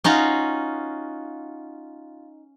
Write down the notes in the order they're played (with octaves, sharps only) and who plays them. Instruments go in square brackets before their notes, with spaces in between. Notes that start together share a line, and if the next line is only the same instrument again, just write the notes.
[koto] C#4 D#4 F4 F#4